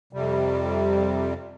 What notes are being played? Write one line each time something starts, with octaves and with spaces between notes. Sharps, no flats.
F2 C3 G3